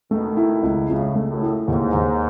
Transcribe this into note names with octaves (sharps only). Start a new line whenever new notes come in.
B2 D#3 A3
E4
C#2
C#2 A2 C#3
A3
F#2 A2
E4
D#2 G#2
D#2